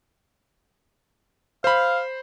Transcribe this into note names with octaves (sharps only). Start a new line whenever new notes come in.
C5 F5 B5